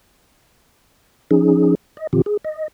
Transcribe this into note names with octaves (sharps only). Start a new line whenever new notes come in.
F3 C#4 D#4 G#4
D#5
A#2 D3 E3 C4 F4 G4
G#4
D#5